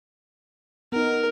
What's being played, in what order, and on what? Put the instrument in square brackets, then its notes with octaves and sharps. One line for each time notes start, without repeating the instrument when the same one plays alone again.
[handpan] B3 D#4 [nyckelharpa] A#4